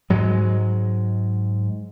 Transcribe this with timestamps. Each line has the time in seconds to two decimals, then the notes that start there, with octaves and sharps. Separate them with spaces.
0.10 G#2 F#3 G#3